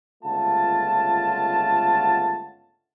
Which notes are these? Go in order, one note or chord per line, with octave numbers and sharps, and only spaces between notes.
G1 C#2 A3 F4 F#5 A5